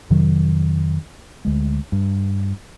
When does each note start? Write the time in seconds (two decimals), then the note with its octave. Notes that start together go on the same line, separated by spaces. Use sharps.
0.10 F2 C3 D#3 F#3
1.45 D2 G#3
1.92 G2